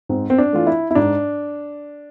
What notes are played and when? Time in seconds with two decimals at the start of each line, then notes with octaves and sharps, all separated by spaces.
0.09 G#2 C4
0.30 C4
0.38 D4
0.53 E3 A3 F4
0.67 E4
0.91 E4
0.95 G#2 D4